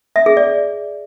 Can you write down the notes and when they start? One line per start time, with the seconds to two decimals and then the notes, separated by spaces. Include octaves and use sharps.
0.16 E5
0.26 G#4
0.37 D5